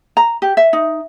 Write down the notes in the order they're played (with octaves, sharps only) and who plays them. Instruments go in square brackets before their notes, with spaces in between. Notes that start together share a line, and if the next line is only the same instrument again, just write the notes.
[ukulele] A#5
G4
E5
D#4